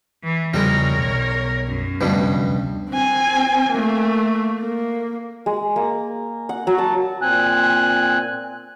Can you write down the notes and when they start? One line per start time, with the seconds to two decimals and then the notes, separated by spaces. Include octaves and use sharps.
0.24 E3
0.54 E2 C#3 F3 G3 G#3 A#4 C#5
0.98 B1
1.67 F#2
2.01 F1 D2 G2 B2 G3 C#4
2.90 C4 G#5
3.72 A3 A#3
4.60 A#3
5.46 G#3
5.76 A#3
6.49 F#5
6.67 F#3
6.78 A5
7.22 A#2 C4 G#5 F#6